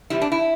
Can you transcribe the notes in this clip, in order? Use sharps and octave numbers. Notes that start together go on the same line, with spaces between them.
C3 E3 G3 E4
D4
E4